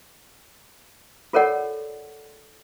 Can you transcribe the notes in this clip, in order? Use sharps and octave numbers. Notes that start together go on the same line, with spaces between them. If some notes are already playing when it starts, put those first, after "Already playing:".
F4 A4 A#4 C#5 D5 F#5